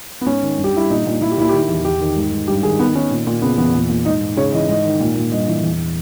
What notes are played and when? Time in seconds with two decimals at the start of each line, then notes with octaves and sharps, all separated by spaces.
0.21 B3
0.26 G#2 C#4
0.43 D#3
0.58 G2
0.64 G4
0.73 G2 E4
0.90 A#2 D#4
1.06 A#2
1.21 A#2 E4
1.31 G4
1.38 A#2 E4
1.49 D#3 G4
1.58 E4
1.68 E2
1.84 E2 G4
2.00 D#3
2.16 G#2
2.32 G#2
2.48 G2 G4
2.63 D#3 G#4
2.79 D#3 B3
2.95 D#3 C#4
3.11 A#2
3.27 A#2
3.42 C#3 B3
3.58 E2 B3
3.73 A#2
3.90 A#2
4.05 G#2 D#4
4.21 G#2
4.37 C#3 C#5
4.53 E3 D#5
4.68 G#2 D#5
4.85 D#3
5.00 A#2
5.16 A#2
5.32 G2 D#5
5.48 E3
5.63 E2